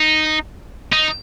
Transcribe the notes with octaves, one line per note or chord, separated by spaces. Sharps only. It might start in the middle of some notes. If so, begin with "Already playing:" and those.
Already playing: D#4
D#4